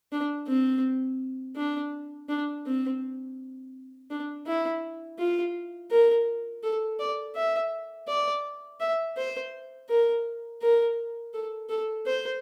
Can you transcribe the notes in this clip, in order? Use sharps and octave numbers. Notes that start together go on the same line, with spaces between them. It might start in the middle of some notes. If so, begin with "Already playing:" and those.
D4
C4
D4
D4
C4
D4
E4
F4
A#4
A4
D5
E5
D5
E5
C5
A#4
A#4
A4
A4
C5